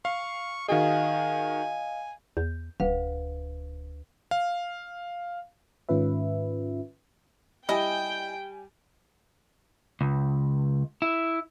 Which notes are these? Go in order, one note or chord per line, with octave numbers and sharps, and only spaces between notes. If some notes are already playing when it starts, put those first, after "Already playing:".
F5 C#6
D#3 F#4 G#4 D#5 F5 G#5
E2 G6
D#1 D2 B4 F5
F5
G#2 D#3 C#4 F4 B4 E5
G3 E4 D#5 G5 G#5
C#2
E4